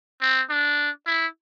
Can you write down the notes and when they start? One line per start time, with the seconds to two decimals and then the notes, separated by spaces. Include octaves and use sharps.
0.21 C4
0.50 D4
1.06 E4